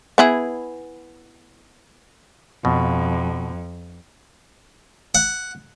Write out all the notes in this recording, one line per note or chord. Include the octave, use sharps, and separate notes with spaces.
B3 E4 G#4
F2 B2
F#5